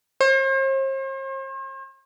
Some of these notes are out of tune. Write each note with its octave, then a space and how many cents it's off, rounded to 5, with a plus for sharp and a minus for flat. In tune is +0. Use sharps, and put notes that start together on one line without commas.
C5 +45